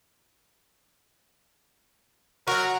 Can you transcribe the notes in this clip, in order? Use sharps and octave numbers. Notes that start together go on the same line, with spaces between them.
F#3 F#4 A#4